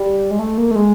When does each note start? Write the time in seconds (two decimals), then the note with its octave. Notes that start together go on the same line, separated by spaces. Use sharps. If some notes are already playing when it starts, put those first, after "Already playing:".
Already playing: G3
0.31 G#3
0.39 A3
0.58 A#3
0.71 A3
0.75 G#3